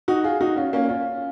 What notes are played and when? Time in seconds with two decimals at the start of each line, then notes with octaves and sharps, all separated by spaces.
0.08 D#4 F#4
0.24 F4 G#4
0.41 D#4 F#4
0.56 C#4 F4
0.73 A#3 C#4
0.89 C#4 F4